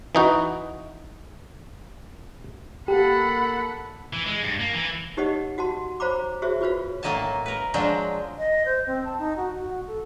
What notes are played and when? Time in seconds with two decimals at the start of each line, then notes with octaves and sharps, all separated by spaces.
0.15 E3 D#4 F#4
2.88 A#3 G4 A4 F#5 A5 B5
4.13 E3
4.26 G#3
4.43 G2
4.59 A#3
4.73 E3
5.17 D#4 G4 C#5 D#5 F#5
5.58 F#4 F#5 A5 C6
6.00 C5 C#5 F5 A#5 B5 D6
6.42 F#4 G#4 C5 C#5 E5
6.61 F4 F#4 B4 C#5 F5
7.03 A2 F#3 A#3 D#5 G#5 A5
7.46 A#4 B4
7.74 F3 F#3 G#3 D4
8.38 D#5
8.65 C5
8.87 C4
9.05 A5
9.19 D#4
9.36 F#4
9.54 F#4
9.87 A4